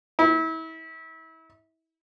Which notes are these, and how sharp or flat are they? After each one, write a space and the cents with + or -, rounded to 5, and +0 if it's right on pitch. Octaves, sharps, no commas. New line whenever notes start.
E4 -35